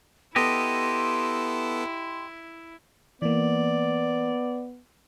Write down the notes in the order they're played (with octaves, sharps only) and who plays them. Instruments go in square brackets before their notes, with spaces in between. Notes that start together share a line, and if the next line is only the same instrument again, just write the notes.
[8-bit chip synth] B3 A4 [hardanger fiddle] E4 [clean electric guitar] G4 D#5 [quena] C6
[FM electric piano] E3 A#3 [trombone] B3 [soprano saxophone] D5